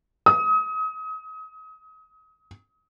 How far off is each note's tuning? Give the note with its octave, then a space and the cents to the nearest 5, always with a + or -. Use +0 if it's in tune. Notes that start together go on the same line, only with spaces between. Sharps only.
D#6 +35